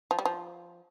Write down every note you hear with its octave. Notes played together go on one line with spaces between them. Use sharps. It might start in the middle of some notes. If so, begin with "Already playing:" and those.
F3
G3
F3